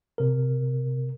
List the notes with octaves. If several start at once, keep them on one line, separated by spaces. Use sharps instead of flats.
C3 A#4